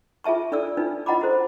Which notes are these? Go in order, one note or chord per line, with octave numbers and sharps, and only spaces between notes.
F4 G#4 E5 A5 C#6
D4 A4 D5 E6
D4 D#4 F4 B4
F4 D#5 F#5 A#5 B5 D6
F#4 A4 C5